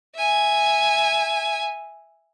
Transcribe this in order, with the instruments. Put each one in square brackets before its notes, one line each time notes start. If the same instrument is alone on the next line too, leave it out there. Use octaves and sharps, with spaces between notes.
[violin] E5 G#5